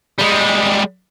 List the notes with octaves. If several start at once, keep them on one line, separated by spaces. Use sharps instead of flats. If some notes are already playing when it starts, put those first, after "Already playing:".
G3 G#3